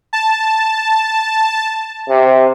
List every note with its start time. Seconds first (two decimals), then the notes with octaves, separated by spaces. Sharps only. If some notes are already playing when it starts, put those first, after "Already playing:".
0.13 A5
2.09 C3